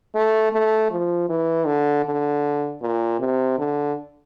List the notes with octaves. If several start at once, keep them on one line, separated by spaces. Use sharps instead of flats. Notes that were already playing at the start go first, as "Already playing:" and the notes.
A3
A3
F3
E3
D3
D3
A#2
C3
D3